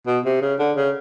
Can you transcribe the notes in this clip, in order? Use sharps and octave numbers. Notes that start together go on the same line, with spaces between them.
B2
C3
C#3
D3
C#3